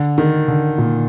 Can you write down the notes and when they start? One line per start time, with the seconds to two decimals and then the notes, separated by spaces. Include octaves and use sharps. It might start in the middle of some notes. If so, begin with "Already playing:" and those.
Already playing: D3
0.18 D#3
0.48 D3
0.78 A#2